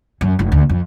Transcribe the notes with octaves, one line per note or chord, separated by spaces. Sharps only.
F#2
F1
D2
F2